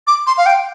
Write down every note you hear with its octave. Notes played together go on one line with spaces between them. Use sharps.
D6
C6
F5
G5